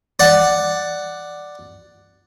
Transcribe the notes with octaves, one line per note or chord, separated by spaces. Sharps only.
D5 F#5